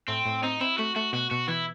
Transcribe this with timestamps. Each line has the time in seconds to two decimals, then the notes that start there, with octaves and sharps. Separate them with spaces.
0.08 A2 C4
0.25 A2
0.43 C4 D#4
0.61 C4 E4
0.78 A3 F#4
0.96 A3 F#4
1.13 B2 F#4
1.31 B2 F#4
1.48 E3 E4